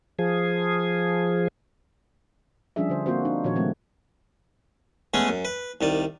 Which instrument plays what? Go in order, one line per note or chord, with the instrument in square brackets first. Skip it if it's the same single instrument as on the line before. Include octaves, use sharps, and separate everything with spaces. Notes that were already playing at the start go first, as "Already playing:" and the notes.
[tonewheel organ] F3 G#4
[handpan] F3 G3 C#4 D4 G#4 E5
D3 C5
A#3 C4 F4 F#4 C5
D4 D#4
A#2 D#3 F3 F#4 C#5
C#3 F3 G#3 A3 C4
[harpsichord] G#3 A3 B3 C#4 G#4
F#2
B4
C2 D#3 D5